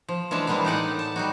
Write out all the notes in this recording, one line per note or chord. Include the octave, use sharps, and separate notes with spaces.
F3
E3 G#3 C#4 D4 A5
E3 G3 G#3 A#3 B3 D4
A2 B3 D#4 D5 D#5 F#5
A5
G3 D#4 F#4